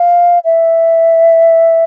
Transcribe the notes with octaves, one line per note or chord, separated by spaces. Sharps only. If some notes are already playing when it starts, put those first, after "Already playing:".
Already playing: F5
E5